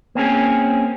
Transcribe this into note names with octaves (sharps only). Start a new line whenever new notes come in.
A#3 C4 C#4 G#4